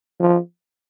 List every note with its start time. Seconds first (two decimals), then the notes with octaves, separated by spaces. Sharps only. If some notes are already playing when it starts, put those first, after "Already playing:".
0.20 F3